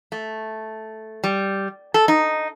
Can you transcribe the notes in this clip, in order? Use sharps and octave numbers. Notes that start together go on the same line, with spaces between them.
A3
G3
A4
D#4